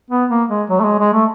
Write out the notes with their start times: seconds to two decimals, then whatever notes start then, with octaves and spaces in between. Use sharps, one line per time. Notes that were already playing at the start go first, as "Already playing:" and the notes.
0.11 B3
0.30 A#3
0.50 G#3
0.70 F#3
0.80 A3
0.84 G#3
0.99 G#3
1.14 A3